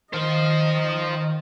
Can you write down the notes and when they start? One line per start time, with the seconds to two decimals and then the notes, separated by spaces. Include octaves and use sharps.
0.13 D#3 C5 D#5 F5